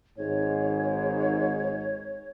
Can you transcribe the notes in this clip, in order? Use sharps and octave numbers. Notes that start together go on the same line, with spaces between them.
G#1 G#2 C#5